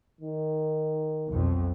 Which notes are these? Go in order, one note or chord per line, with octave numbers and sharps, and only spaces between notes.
D#3
B1 F2